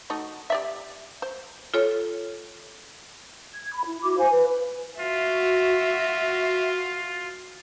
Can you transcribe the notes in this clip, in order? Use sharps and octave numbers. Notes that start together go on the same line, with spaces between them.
A3 D#4 F#4
G4 D5 E5
C5
F4 A4 C#5
G#6
B5
E4
E4 F#4 D6
C5 F5 G#5
B4
F4 F#4 E5